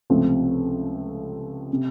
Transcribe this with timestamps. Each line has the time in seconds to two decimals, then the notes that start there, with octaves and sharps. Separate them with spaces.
0.10 C#2 C3 F3 A3 C4
1.73 C3